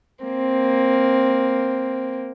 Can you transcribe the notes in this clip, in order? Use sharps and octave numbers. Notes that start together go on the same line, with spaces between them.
A#3 C4